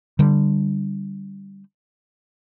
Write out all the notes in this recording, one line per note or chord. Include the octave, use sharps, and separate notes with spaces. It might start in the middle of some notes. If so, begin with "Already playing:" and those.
D3 G3